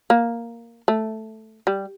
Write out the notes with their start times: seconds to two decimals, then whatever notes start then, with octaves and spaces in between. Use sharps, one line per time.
0.10 A#3
0.88 A3
1.67 G3